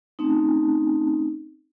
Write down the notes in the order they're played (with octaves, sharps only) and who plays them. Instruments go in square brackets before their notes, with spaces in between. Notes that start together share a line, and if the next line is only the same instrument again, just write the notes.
[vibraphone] A3 C4 C#4 D#4